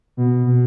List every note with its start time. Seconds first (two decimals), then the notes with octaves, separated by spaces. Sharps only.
0.17 B2
0.46 B2